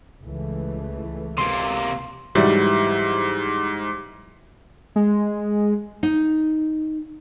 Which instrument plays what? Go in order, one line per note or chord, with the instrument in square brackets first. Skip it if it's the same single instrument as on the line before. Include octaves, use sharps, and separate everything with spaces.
[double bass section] C#2 E3 A3
[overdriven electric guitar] C3 A#3 [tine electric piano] C6
[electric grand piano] G#2 [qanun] E3 F#3 E4 [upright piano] G3
[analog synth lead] G#3
[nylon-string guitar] D#4